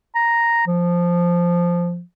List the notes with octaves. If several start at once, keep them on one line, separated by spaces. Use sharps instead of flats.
A#5
F3